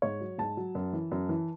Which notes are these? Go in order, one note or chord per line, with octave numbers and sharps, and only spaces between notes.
G#2 C#5
F#3
G#2 A5
F#3
F#2
E3
F#2
E3